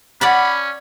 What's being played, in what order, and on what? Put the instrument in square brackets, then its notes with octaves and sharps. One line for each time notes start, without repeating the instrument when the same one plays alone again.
[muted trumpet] C#4 [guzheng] D5 F#5 A5 [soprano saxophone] B5